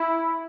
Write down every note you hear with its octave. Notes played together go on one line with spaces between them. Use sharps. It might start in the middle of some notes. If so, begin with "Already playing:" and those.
Already playing: E4